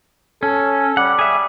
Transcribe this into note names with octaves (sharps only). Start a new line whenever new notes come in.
C#4 A4
G3 F#5
G#4 E5